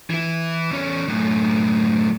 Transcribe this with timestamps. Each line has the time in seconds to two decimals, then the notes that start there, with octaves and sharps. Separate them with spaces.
0.10 E3 E4
0.72 E2 C#4
1.08 F#2 A2